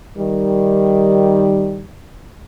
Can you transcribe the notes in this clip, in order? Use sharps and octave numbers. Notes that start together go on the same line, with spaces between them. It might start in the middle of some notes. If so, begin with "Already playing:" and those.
D#3 G3